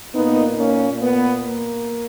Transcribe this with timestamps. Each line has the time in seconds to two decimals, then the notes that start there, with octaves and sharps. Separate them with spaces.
0.13 A#2 A#3 B3 D#4
0.57 A#3 C#4
1.01 B3
1.46 A#3